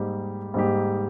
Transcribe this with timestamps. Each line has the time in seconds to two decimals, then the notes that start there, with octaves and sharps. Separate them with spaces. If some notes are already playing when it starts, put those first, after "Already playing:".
Already playing: G#2 G3 A#3 D#4 G4
0.54 G#2 G3 A#3 D#4 G4